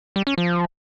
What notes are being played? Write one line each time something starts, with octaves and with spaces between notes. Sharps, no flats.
G3
C#4
F3